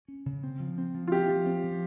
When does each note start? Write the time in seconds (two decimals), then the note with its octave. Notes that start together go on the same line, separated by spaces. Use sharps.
0.08 C#4
0.26 C#3
0.43 C4
0.60 F3
0.78 C4
0.95 F3
1.08 F4
1.12 C4 G4
1.29 F3
1.46 C4
1.64 F3